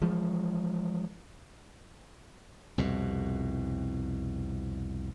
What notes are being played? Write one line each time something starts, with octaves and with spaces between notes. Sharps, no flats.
E3 F3 G#3
C2 F2 B2